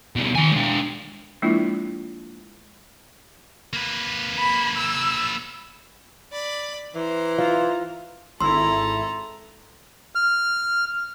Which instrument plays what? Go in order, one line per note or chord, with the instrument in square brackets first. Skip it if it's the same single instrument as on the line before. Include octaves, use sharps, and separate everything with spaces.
[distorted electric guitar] B2 G3
D#3 G#5
G#3 D4
[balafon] F3 G#3 A#3 D4 E4 F4
[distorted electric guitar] A#3 B4
[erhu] B5
E6
[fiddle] D5 B5
[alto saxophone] E3 [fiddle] C5 A#5
[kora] F4
[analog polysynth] G#1 E4 [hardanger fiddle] A4 A#5 [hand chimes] C6 E6
[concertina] F6